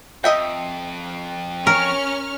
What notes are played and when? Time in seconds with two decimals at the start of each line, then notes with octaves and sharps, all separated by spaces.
0.24 F2 D#5 E5 G5
1.67 C#4 A#4 C#6 F6